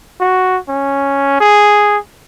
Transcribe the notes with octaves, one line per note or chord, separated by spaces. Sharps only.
F#4
C#4
G#4